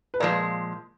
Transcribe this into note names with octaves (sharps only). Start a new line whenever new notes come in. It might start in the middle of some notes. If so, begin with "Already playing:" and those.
B4
A#2 F3 G#3 A#4 D5